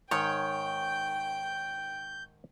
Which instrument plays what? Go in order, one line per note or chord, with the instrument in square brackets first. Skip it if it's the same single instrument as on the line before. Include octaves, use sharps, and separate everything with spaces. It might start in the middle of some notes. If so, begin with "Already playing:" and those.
[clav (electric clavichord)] G#2 D#3 [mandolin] C#5 [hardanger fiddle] G5 [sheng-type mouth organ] G6